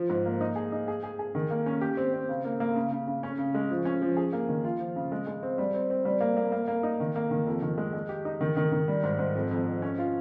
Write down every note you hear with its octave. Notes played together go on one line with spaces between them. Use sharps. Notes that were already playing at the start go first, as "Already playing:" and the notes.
Already playing: F3
G#2
A#3
D#4
G#4
D#4
G#4
G#4
G#4
D#3
A#3
C#4
G4
C4
C4
C#3
A#3
A#3
C#3
C#3
C#3
C#4
C#3
G#3
F3
C#4
F3
G#4
A#3
D#3
F4
F3
C#3
G#3
G#3
C4
G3
C4
C4
G3
A#3
A#3
A#3
A#3
D#4
D#3
A#3
D#3
F2
D#3
G#3
G#3
G4
D#4
D#3
D#3
D#3
G3
G#2
G#2
F2
F2
F2
C#4
F4